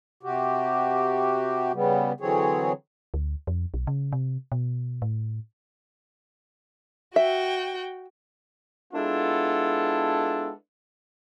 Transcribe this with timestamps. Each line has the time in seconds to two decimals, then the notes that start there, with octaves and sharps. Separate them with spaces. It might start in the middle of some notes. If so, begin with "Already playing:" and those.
0.23 C3 F#4 G4
1.74 C#3 G3 B3
2.20 D3 E3 F#3 C4 G#4 C#5
3.14 D2
3.47 F2
3.74 B1
3.87 C#3
4.12 C3
4.52 B2
5.02 A2
7.16 F#4 E5 G5
8.94 G#3 B3 D4 E4 F4 A4